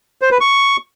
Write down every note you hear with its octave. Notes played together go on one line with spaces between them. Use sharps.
C5
B4
C#6